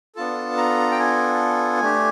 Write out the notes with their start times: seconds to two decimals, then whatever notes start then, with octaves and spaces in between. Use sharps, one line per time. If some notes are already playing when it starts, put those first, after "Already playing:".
0.15 B3 D4 F4 A4 A5
0.57 A#5
0.91 G5
0.99 G#5
1.81 A3 D4 G4